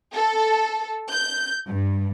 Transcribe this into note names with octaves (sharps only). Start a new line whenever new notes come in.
A4
G6
G2